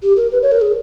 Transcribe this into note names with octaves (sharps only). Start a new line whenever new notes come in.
G4
A#4
B4
C#5
A#4
G#4